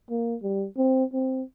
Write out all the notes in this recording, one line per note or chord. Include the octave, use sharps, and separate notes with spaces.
A#3
G3
C4
C4